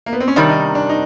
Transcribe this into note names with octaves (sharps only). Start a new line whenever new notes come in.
A#3
B3
C4
C#4
C3 D#3 G3 D4
D#4
D4
D#4